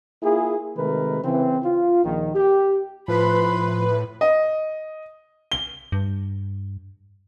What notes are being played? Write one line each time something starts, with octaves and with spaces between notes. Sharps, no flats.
A#3 E4 F4 G#4
C3 D#3 G#3 A3 A#4 B4
C#3 E3 C4
F4
A#1 D#3
G4
A2 F3 B4 B5 C6
D#5
G7
G2